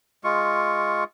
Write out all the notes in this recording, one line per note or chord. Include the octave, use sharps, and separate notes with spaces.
G#3 F4 C#6